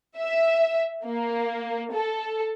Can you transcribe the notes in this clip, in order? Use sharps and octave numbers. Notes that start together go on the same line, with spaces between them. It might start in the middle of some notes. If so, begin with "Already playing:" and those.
E5
A#3
A4